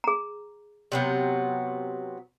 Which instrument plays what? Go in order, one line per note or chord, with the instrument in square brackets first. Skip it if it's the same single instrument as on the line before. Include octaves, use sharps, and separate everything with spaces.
[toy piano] G#4 A#5
[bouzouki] C3 F#3 B3